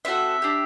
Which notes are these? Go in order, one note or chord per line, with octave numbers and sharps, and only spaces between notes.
C4 F#4 A4 E5
D4 G4